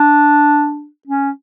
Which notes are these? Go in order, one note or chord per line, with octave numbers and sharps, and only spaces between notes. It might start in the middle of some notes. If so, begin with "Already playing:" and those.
Already playing: D4
C#4